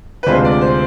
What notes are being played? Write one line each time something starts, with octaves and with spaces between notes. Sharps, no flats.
B4
D2 C3 G#3 D4 F4 C5
D5
C5